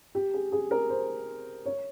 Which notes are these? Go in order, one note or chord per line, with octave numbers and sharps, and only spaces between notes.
G4
G#4
G#4
A#4
C5
C#5